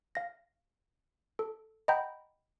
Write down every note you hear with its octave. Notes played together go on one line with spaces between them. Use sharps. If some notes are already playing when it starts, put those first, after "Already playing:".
F5 A#6
A4
D#5 F#5 G5 A#5 B5 G6